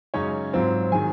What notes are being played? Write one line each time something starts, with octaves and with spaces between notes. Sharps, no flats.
F#2 C#3 G#3 C#4 D#4 C#5
G#2 F#3 C4 F4
D#3 F#3 G#4 G#5